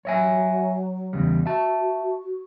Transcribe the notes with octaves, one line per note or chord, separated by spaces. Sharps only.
F#3 C#5 E5 G#5
E2 C#3 G3
F#4 E5 A5